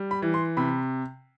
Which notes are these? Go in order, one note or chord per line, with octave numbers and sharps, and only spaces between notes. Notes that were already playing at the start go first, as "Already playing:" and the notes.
Already playing: G3
B5
E3
C6
C3 B5